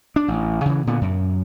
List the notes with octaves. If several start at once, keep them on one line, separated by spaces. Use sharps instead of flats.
D4
A1
C#3 E3
A#2 D3 B3
F#2